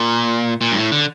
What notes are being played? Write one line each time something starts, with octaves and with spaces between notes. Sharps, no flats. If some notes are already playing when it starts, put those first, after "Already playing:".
Already playing: A#2
A#2
G2
A2
D3